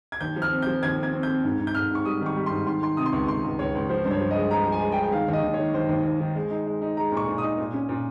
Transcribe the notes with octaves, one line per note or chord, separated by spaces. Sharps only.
G#6
D#2 G6
F3
F6
C4
F3 G6
D#2 G#6
C4 G#6
C4
C4 G6
G#2
G#2
G6
G#2 F6
G#2 C#6
G3 D#6
D#3
C#6
G3
G#2 C6
D#3 C6
D#3 C6
C3 D#6
C6
C#2 C#6
C#2 C6
C#2
C#2 C#5
C#2
F3 C5
G2 C5
C#5
F3
D#5
G#3
F3 A#5
F3
G#5
G#3
G5
G#3
G5
D#3 F5
D#2 D#5
D#2
C#5
D#3
D#2 C5
D#2
D#2
D#3
G#3
D#4
G#3
D#4
G#3 A#5
A#2 C#6
A#2
D#6
D#4
A#2
C#4
A#2